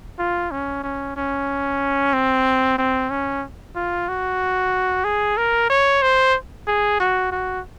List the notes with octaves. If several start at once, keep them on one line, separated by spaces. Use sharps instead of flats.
F4
C#4
C#4
C#4
C4
C4
C#4
F4
F#4
G#4
A#4
C#5
C5
G#4
F#4
F#4